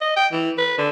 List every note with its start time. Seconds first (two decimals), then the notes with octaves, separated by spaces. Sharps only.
0.01 D#5
0.16 G5
0.32 E3
0.58 B4
0.78 D3